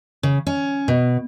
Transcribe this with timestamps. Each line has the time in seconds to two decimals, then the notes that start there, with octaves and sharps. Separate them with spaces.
0.23 C#3
0.47 C#4
0.88 B2